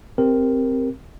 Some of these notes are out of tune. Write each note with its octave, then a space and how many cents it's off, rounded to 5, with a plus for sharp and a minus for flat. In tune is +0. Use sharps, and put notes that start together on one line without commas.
C4 +0 G4 +0 A#4 +0